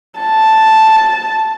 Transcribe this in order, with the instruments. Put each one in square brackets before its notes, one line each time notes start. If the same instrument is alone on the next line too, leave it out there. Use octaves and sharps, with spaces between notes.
[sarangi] A5